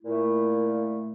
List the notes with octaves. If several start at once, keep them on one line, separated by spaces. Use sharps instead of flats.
A#2 A3 E4